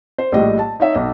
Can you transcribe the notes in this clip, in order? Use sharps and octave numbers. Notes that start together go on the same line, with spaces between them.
C5
A#1 A2 G3 D#5
A5
D#4 C#5 E5
B1 D#5